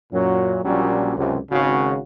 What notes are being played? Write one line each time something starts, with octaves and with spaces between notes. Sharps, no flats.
F#2 A#2 F#3
A#1 A#2 F#3 G3 C#4 D4
C#2 F#2 C3
G#1 C#3 F#4